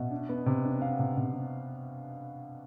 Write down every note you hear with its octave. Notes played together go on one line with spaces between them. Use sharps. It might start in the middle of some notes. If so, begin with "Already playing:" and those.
Already playing: B2 E5
D4
B3
C3
D4
B3 F5
C3
C3
C3